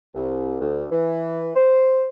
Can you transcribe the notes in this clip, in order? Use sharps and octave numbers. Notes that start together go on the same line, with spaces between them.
C2
D2
E3
C5